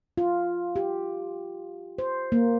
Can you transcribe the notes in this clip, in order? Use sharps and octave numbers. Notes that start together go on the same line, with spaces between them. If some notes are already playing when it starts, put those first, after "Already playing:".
F4
G4
C5
A#3